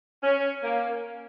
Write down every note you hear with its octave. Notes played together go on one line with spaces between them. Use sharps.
C#4
A#3